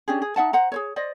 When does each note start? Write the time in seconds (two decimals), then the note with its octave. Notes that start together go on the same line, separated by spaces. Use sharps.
0.08 C#4 D4 G4 G#4
0.22 G#4
0.36 D#4 E5 F#5 A5
0.53 C5 F#5 A#5
0.72 G#4 C5 C#5
0.96 C5 D5 D#5